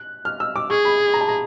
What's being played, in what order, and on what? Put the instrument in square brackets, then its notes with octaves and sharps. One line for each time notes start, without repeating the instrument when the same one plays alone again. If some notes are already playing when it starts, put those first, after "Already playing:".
Already playing: [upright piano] F#6
F6
E6
D6
[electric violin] G#4 [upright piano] C#6
[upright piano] B5
A#5
A5
A#5